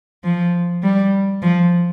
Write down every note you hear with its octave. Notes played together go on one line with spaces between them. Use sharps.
F3
G3
F3